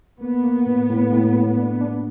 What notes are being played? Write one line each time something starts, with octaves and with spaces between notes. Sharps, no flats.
A#3 B3
A#3
A2
A2
A2
A2
D4
D4